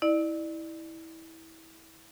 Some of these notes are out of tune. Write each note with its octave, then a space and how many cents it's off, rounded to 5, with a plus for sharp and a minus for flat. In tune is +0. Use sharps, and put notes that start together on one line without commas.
E4 -20 D5 +30